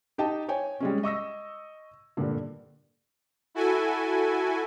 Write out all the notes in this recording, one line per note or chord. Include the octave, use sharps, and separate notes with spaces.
D#4 G4 D#5 G5 A5
C#5 G5 G#5
G3 G#3 C#4
D#5 C#6 E6 A#6
G2 A#2 D3
E4 F#4 A4 G#5